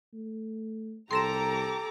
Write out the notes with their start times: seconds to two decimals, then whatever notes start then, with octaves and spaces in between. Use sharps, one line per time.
0.13 A3
1.11 C2 G4 A4 A#5 C6 D6 A#6 E7